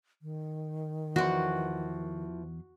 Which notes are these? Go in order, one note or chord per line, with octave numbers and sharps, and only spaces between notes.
D#3
E2 E3 F3 F#4 D5 C6